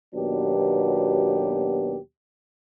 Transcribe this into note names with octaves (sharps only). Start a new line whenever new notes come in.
D#2 B2 F#3 B3 D4 G4